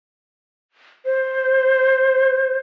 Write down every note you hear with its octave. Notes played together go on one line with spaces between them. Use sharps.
C5